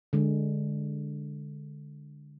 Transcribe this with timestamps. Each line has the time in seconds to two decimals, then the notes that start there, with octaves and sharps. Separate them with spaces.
0.13 D3 G#3